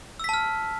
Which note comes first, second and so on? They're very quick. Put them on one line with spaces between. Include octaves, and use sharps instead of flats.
E6 B6 A5 F6